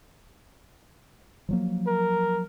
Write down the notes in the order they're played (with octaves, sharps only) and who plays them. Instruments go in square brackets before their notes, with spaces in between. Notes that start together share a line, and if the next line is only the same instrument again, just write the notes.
[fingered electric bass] F3 F#3 A#3
[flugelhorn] A#4